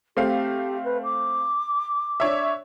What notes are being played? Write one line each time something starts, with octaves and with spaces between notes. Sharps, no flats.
A3 C4 G4 F5
B4
D6
D4 C#5 E5